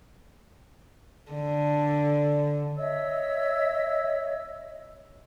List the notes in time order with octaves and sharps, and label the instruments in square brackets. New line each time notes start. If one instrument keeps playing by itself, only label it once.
[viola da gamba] D3
[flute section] C#5 D#5 E5 E6